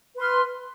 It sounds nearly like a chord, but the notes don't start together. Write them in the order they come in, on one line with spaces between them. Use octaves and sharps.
B4 C6 F6